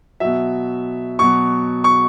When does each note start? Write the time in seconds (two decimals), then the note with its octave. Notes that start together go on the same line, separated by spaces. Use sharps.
0.20 B2 F#3 E5
1.19 B2 F#3 C#6
1.84 C#6